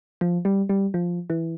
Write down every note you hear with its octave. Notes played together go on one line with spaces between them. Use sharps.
F3
G3
G3
F3
E3